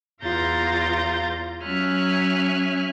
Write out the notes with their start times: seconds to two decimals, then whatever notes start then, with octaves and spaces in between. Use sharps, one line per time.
0.23 E2 F4 F5 A#5 G6 A6
1.63 F#3 C#4 E5 G#5 F6 F#6